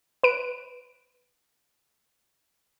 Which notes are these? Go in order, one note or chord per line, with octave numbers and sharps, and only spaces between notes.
B4 D7